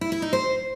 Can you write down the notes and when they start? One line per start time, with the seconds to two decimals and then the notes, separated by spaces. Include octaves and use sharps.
0.01 E4
0.12 E4
0.22 D#4
0.33 C5